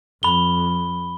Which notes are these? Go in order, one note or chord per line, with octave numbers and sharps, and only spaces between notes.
F2 B5 G7